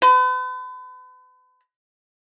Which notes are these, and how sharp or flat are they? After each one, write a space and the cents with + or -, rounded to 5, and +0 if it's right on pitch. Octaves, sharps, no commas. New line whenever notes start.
B4 +40